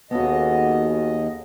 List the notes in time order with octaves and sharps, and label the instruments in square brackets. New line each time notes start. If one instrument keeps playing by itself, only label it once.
[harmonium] D#2 D#5 [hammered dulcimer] C#3 A4 F#5 [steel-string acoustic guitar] B3 F#4